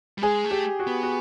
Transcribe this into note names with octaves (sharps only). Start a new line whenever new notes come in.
G3
G#3 G#4
A3
G4
F#4
B3
F#4